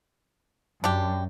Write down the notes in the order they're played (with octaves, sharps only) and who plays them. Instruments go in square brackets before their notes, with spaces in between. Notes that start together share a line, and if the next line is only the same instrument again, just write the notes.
[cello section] F#2 [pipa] D4 G4